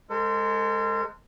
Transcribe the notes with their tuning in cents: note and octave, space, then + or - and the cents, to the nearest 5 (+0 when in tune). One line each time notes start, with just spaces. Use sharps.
G#3 +0 A4 +45 C5 -25